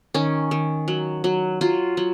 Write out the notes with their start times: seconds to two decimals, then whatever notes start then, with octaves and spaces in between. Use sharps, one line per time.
0.14 D#3 C#4
0.51 D#3
0.88 F#3
1.24 F#3
1.61 F#3 F4
1.97 F#3